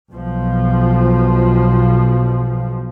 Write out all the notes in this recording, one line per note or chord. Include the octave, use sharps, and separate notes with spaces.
B1 F3